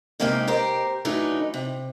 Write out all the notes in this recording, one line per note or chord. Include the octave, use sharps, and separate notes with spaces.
C3 G#3 A#3 D#4 G4
G4 A#4 C5
E3 F#3 A3 D4 D#4
C3